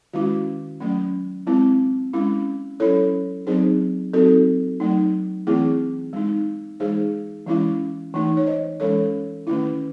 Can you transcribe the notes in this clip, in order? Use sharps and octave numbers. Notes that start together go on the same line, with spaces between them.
D#3 G#3 C#4 E4 F#4
F#3 A3 C#4
G#3 C4 E4
G#3 C#4 E4
F#3 C#4 E4 A4 C#5
F#3 C4 D#4 G#4 C5
F#3 C4 D#4 F#4 A4
F#3 A3 D#4
E3 A3 C4 E4 G#4
G#3 D#4
E3 G#3 D#4 G#4 C5
E3 G#3 C#4 E4
E3 A3 D#4
C#5
C5 D#5
E3 G#3 C#4 A4 C#5
D#3 A3 C#4 E4